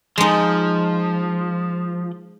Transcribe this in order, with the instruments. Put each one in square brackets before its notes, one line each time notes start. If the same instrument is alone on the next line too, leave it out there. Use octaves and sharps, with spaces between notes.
[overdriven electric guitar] F3 [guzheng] G#3 D#4